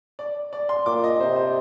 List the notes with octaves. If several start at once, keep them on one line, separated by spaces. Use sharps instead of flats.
D5
D5
C6
A#2 D6
D#5
C3 C5
C5